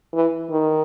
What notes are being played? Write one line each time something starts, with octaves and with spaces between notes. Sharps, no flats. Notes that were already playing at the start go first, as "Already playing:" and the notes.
E3
D#3